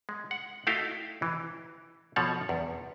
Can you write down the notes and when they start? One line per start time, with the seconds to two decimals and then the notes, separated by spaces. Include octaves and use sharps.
0.09 G#3
0.31 F#5
0.67 A3 D#4 E4 F#4 F5 G5
1.22 E3
2.16 B2 F3 A4 C#5 F#5
2.49 E2